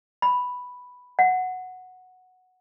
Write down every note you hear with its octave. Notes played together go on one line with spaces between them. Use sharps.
B5
F#5